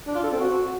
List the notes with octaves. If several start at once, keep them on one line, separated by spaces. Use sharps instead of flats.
D4
F4
A4
C4
F#4